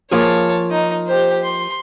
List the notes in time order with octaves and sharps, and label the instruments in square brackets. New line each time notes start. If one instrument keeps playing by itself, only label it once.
[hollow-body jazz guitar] F3 A#3 G#4 [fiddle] C#5 A5
[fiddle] D#4
G4 C5
C6